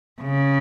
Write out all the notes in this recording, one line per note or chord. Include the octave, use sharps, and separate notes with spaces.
C#3